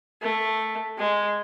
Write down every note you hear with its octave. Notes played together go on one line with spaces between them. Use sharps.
A3
G#3